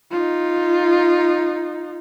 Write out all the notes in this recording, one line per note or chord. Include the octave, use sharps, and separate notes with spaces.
D#4 F4